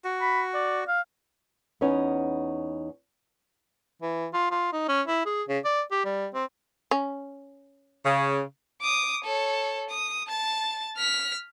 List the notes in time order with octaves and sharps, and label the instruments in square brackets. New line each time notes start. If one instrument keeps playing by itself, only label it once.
[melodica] F#4
[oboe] B5
D5
F5
[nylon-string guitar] E2 B3 C#4 D#4 G#5
[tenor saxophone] E3
F4
F4
D#4
C#4
E4
G#4
C#3
D5
G4
G3
C4
[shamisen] C#4
[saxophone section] C#3
[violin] D6 D#6
A4 C#5
D#6
A5 A6
F6 B6